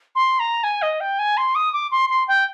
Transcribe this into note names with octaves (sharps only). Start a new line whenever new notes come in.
C6
A#5
G#5
D#5
G5
G#5
C6
D#6
D6
C6
C6
G5